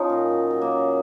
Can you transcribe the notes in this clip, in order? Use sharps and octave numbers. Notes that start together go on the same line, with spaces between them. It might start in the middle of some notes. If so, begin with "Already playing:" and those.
Already playing: F3 C#4 D#4 F4
A#2
F#3
F#3
A#3
C#3